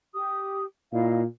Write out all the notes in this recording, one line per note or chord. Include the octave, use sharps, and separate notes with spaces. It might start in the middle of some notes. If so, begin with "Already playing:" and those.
G4 D#6
A#2 E4 D#5 F5